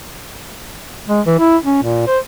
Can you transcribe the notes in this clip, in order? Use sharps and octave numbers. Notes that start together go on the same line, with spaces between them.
G#3
E3
E4
C#4
A#2
C5